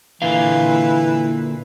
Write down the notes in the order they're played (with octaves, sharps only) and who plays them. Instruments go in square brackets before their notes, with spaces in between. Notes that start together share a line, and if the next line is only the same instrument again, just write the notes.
[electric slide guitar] A#2 D3 F5 [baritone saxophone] E3